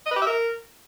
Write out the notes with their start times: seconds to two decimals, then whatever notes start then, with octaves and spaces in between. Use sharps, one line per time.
0.06 D#5
0.11 B4
0.16 G4
0.21 E5
0.26 A#4